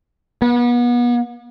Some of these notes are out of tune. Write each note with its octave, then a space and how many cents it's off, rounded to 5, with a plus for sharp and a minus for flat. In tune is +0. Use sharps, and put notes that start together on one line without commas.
B3 -35